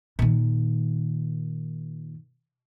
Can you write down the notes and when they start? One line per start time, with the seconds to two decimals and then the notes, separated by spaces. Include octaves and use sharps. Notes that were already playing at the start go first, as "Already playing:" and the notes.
0.19 A#2 D#3